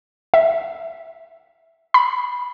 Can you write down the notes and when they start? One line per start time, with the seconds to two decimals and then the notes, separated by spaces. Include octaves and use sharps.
0.34 E5
1.94 B5